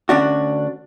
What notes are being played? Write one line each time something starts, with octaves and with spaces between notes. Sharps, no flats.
D2 C#4 D4 F#4